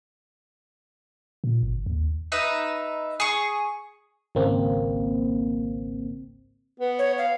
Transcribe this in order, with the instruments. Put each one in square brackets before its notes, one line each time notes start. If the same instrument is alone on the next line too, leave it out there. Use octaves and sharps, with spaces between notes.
[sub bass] A#2
G1
D#2
[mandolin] D#4 B4 E5
G#4 C#6
[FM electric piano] G#1 C#2 A#3 C4
[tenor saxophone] B3
[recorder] C#5
F5